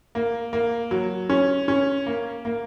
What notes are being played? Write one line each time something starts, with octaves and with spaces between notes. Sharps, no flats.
A#3
A#3
F#3
C#4
C#4
A#3
A#3